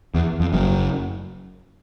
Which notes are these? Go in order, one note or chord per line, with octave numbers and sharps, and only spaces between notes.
E2
F2
F#1 F#2